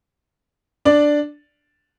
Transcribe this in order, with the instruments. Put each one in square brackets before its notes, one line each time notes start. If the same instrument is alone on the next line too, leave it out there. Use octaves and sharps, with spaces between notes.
[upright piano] D4 D5